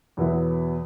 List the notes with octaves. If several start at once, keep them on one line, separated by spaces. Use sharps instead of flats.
E2 B2 F#3 B3 E4